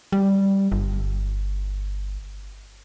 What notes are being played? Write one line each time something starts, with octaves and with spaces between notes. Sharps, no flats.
G3
G1